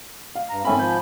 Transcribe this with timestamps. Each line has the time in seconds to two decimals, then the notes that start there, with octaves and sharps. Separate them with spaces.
0.35 F5
0.50 G2 A#5
0.65 G#1 A3 C4 C#4 G#5 B5
0.79 F3 G6